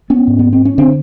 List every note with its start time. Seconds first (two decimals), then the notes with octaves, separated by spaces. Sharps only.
0.10 B3 C#4
0.27 G#2
0.39 B3
0.53 C4
0.65 C#4
0.78 D3 C4 D4